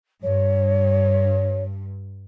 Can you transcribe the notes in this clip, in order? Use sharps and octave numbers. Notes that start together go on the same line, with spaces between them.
G2 C#5